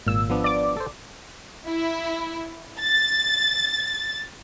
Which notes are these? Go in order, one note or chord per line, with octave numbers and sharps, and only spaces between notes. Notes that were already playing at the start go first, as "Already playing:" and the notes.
G#1 A#2 E6
F3 B3 D4
D5 D6
A4 C5
E4
A6